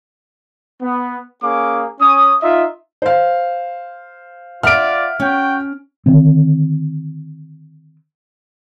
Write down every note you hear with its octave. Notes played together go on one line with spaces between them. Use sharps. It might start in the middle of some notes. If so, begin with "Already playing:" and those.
B3
A#3 C#4 G#4 F5 D6
C#4 D#6
D#4 F4 D#5 E5
C5 F5
F4 D5 E5 F#5 F6 D7
C#4 F#4 G5
D3 D#3 C4